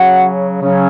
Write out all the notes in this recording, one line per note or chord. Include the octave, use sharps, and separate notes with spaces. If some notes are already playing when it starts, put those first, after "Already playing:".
Already playing: C#3 F#3 C#4 F#4 F#5
C#3 F#3 C#4